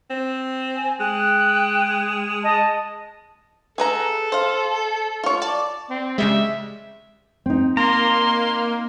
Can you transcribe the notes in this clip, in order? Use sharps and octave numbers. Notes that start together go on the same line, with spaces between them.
C4
G#5
G#3 G5 F#6
D#5 A5
G#4 A4 B4 A#5
C5 F5
F4 C#5
D5 A5
C4
C#3 G3 G#3 E5
C4 D#4
A#3 A#5 C6